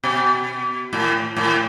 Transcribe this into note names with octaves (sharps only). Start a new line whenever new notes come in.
B2
A2
A2